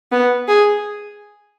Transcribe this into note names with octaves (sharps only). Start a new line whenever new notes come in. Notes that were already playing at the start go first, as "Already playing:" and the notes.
B3
G#4